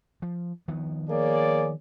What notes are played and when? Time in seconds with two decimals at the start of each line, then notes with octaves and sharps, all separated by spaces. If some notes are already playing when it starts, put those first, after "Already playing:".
0.22 F3
0.68 D#3 F3 B3
1.10 A#3 G#4 C#5 D5